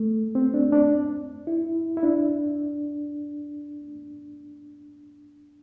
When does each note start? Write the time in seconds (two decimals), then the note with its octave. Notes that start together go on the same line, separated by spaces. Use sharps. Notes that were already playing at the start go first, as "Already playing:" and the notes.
Already playing: A3
0.35 C4
0.54 D4
0.72 D4
1.47 E4
1.97 E4
2.03 D4